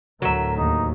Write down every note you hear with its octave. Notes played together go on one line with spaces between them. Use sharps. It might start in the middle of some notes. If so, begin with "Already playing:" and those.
D2 A2 F#3 A3 A#4 E5
D#2 D#4